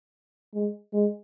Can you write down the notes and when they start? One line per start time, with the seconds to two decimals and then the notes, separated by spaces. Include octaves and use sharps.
0.54 G#3
0.93 G#3